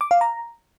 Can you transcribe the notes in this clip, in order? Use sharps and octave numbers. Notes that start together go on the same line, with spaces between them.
D6
F5
A#5